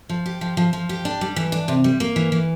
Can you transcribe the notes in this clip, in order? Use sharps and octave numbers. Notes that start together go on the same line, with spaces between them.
F3
G4
F3
F3
F3
G4
D4
G3
E3
D4
C3
G3
A#3
E3
E3